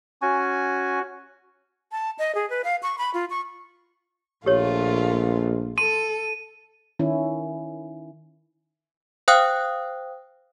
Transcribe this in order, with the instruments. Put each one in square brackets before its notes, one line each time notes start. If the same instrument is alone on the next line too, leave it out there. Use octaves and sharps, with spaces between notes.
[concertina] C#4 G#5 [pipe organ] F#4
[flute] A5
D#5
G#4
B4
F5
C#6
B5
F4
C#6
[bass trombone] A#1 [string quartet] A#2 A3 F4 [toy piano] G4 C#5
[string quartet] A4 [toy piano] C6 [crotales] D#7
[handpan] D#3 C#4 E4
[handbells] C5 F5 G5 D#6 F#6